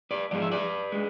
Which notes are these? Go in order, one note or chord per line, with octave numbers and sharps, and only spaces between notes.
B4 D5
G#2 F3 G#3 D5
E5
B4 D5
G#3